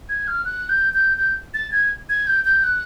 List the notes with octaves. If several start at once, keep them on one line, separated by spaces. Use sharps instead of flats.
G#6
F6
F#6
G6
G6
G6
A6
G#6
G#6
G6
G6
F#6